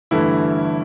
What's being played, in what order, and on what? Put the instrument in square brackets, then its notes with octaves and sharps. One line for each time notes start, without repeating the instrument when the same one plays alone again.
[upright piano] G1 G2 D3 E3 A3 E4